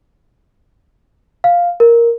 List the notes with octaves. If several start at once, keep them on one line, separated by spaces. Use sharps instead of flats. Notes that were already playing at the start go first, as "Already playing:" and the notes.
F5
A#4